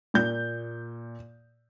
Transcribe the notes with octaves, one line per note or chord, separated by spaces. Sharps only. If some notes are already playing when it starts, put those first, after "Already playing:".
A#2 G6